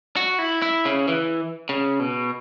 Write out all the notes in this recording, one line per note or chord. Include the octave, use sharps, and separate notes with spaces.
F#4
E4
E4
C#3
E3
C#3
B2